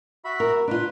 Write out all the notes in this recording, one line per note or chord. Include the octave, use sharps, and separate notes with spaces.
F#4 E5 B5
A#4
D4 F4 B4